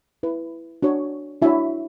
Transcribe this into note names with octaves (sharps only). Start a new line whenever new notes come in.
E4 B4
D4 F#4 C#5
D4 E4 F#4 C#5 E5